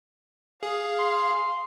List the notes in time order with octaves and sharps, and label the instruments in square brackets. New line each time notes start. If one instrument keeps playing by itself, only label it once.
[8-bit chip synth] G#4 [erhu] F5
[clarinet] C6